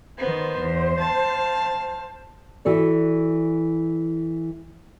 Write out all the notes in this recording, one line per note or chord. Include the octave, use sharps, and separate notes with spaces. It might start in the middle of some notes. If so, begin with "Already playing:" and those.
D#3 B3 C5
E2
F5 A5
E3 F#4 A4 D5